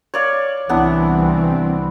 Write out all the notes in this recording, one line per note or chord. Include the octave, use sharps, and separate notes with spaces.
C#5 D5 F5
C2 E3 B3 C4 D4 E4